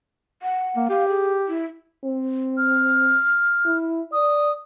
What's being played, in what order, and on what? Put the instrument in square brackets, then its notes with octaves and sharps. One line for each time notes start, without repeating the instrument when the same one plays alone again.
[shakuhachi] F#5
[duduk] A#3
[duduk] G4 [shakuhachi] F5
[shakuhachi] G#4
E4
[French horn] C4
[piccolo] F6
[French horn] E4
[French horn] D5 [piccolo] D#6